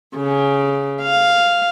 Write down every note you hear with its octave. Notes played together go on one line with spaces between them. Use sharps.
C#3
F5